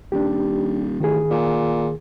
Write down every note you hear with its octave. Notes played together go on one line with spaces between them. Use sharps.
D#1 D4 G4
A1 D#3 G#4
A#2